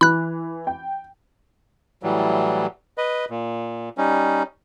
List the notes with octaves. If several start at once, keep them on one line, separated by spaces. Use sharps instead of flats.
E3 B5 F#6
G5
A2 E3 F#3 G3
B4 D#5
A#2
G3 C#4 D#4